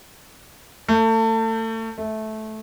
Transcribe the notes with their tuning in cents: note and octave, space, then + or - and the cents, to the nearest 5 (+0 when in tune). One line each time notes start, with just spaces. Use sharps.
A3 +30
A3 -15